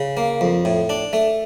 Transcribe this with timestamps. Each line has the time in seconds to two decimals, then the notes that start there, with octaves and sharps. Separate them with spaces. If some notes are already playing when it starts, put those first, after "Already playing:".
Already playing: C#3
0.17 A#3
0.41 F2
0.65 A2
0.89 D4
1.13 A3